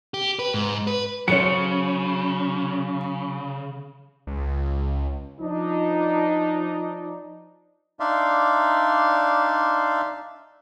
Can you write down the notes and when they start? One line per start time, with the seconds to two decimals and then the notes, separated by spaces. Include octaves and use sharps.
0.14 G4
0.39 B4
0.54 G#2
0.87 B4
1.28 C#3 F#3 C#4 A4 C5 C#7
4.27 C#2
5.40 F3 D4 D#4
8.00 D4 D#4 D5 E5 F5 C6